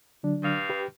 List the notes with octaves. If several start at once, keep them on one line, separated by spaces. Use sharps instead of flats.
D3 F#3 D4
G2 F5
G4 B4